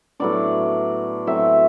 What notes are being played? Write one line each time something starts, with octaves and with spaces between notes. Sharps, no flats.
A2 F#3 B3 D4 D5
A2 F#3 C4 E5